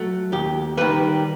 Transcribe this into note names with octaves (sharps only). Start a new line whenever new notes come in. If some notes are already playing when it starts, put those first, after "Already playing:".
Already playing: F#3 A3
D#2 G4
D#3 G3 B4